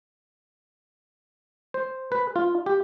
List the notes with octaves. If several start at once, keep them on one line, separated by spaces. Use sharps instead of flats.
C5
B4
F4
G4